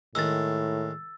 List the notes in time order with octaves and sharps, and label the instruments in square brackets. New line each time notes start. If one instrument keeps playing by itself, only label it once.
[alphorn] A2 [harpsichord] D#3 G#3 [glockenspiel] E6 A6